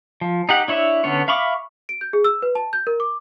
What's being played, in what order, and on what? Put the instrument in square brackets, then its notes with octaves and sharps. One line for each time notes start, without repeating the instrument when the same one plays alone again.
[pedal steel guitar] F3
D#4 G4 F#5
D4 E4 C#5 E5
D3 B3 C#4 C#5
E5 F5 B5 C#6 D6
[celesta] D7
G6
G#4
E6
B4
A5
G6
A#4
D6